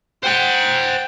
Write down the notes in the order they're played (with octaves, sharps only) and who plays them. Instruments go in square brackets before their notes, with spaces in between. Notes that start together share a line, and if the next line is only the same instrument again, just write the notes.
[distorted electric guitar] C5 F#5 [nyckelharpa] G5